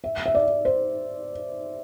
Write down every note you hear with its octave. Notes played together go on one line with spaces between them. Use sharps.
E5
E5
D5
C5